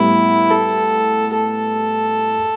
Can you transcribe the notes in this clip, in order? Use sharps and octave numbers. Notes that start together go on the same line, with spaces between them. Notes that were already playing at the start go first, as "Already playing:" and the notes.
Already playing: A2 G3 B3 E4
A4
A4